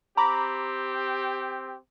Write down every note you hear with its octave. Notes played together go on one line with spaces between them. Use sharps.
C4 G4 A#5 B5 D6